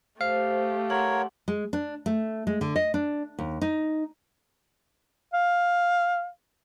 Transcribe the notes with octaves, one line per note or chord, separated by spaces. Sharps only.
A3 G4 C5 F5
A#4 C#5 F#5 C6
G#3
D4
A3
G#3
D3
D#5
D4
D#2
D#4
F5